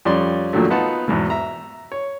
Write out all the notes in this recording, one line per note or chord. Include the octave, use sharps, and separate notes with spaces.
F2 G3 C#4 D5 C6
F2 A#2 D3 D#3 F#3 A3
B3 D#4 F4 F#5 A5
E2 G#2 B2
E5 A#5
C#5